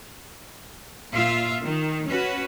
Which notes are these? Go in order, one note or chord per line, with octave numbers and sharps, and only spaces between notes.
A#2 F4 E5 F5
D#3
C#4 F#4 B4